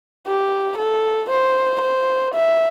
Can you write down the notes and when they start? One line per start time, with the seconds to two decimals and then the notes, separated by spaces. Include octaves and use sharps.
0.27 G4
0.78 A4
1.30 C5
1.81 C5
2.34 E5